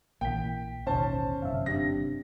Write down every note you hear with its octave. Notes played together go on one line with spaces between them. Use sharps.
A#1 D#3 E3 A#3 G5 B6
A1 D#2 B2 D#3 C#4 C5 A5
G1 F#2 C3 E5 F5
C4 D4 G4 A#6